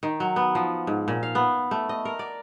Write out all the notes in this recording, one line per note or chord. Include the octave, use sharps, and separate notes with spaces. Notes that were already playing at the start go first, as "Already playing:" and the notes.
D#3
F#3
B3
F3
G#2
A#2
F5
B3
A3
D#5
A#4
D5